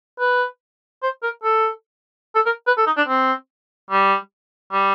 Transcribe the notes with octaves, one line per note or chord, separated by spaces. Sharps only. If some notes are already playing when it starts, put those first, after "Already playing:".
B4
C5
A#4
A4
A4
A#4
B4
A4
D#4
D4
C4
G3
G3